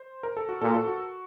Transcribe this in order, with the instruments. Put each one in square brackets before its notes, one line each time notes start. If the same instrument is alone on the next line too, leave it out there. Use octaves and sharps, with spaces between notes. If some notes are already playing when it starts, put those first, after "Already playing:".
Already playing: [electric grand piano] C5
A#4
A4
F#4
[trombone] A#2 [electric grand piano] A4
[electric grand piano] A4
F#4